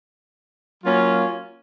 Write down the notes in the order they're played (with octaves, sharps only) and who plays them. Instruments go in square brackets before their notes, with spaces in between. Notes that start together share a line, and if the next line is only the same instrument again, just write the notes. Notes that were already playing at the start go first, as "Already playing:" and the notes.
[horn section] F#3 A#3 C#4 F4